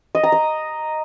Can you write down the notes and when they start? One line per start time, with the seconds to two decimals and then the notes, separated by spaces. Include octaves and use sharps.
0.15 D#5
0.23 A#5
0.32 D#5